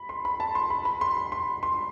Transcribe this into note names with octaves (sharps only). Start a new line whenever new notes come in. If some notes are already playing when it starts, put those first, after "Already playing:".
Already playing: B5
C6
B5
A5
C6
B5
B5
C6
B5
C6
C6